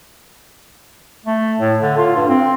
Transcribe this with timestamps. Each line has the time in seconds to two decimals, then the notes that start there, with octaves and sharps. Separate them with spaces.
1.26 A3
1.59 A2
1.81 D3
1.98 F4
2.16 G2
2.29 C4